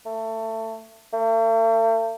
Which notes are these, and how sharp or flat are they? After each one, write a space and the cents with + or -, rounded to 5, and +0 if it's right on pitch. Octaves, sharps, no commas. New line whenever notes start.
A3 +20
A3 +45